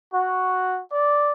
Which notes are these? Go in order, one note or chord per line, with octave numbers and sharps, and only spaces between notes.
F#4
D5